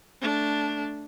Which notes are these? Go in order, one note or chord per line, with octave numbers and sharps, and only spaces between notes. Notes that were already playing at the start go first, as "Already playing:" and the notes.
A3 D4